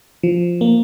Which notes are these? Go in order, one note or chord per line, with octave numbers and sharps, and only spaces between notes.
F3
A#3